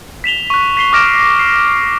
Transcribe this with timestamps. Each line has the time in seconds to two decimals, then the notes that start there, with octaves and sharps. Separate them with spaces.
0.24 B6 E7 F7 G7
0.50 C#6 F#6
0.77 B6 C7 G7
0.93 D6 F6 A#6 D7 E7
1.39 C7